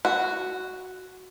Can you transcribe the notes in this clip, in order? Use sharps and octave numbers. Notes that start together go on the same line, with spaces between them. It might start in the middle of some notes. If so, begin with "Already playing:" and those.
F#4